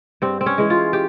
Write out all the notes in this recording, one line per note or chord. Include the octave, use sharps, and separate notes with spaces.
G2 C4
C4
C#4
E3 G#3
F4
G4